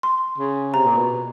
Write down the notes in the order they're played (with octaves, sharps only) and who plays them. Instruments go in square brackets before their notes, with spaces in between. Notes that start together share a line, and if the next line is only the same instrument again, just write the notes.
[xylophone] C6
[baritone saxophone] C#3
[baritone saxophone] C3 [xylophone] A#5
[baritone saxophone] A#2
B2